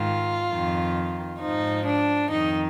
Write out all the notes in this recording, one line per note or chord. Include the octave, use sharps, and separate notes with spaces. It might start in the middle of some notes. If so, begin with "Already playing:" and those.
Already playing: G#2 D#3 F4
F2 D#3
G#2 F3 D#4
D4
F2 D#3 D#4